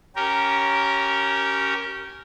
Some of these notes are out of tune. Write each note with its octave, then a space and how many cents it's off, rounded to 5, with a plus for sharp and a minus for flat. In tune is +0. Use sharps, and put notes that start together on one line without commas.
C#4 +0 G4 -20 A#4 +0